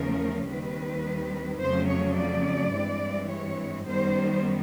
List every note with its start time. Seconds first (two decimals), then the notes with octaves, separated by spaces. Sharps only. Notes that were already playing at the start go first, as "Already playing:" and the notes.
Already playing: E2 C#3 F3 A3 C#4 A#4
0.47 D#2 D#3 G3 C4 B4
1.60 F2 C#3 F#3 A3 C5
1.89 C#5
2.17 D5
2.73 G2 E3 G#3 C4
3.30 C#5
3.86 F#2 D#3 G3 B3 C5